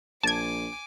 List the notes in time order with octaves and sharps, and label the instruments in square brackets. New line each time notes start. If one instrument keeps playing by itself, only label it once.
[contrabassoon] A#1 [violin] G#5 D6 [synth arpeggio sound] A5 G#6